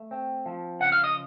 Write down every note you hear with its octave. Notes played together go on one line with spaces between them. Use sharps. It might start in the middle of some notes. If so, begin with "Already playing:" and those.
Already playing: A3
C4
F3
C#3 F#5
F5
D#5